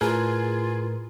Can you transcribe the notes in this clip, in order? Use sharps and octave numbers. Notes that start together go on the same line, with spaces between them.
A2 F4 G#4 A#4 B4